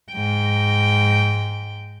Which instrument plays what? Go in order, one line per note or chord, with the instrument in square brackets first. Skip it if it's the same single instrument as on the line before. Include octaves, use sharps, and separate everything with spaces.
[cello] G#2 G5